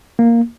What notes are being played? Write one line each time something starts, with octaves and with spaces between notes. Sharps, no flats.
A#3